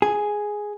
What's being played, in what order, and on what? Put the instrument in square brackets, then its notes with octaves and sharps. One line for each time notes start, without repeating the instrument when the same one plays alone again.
[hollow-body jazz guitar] G#4